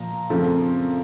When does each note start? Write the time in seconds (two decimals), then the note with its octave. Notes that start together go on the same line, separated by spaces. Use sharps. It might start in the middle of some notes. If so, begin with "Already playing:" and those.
Already playing: A#2 F3 A#5
0.30 F#2 C#3 F3 A3 C4